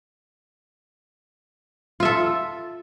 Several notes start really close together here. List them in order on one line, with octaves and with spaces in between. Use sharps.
F4 E5 A4